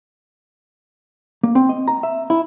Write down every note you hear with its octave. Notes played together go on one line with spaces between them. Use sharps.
A#3
C4
D#5
A#5
E5
E4